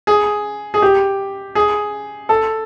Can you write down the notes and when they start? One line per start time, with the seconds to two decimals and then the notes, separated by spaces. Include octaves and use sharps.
0.07 G#4
0.74 G#4
0.82 G4
1.55 G#4
2.29 A4